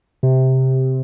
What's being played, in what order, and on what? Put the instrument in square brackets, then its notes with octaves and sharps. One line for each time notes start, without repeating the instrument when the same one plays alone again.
[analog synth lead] C3